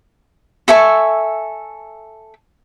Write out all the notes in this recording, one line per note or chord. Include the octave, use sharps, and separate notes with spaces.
A4 E5 G#5 C#6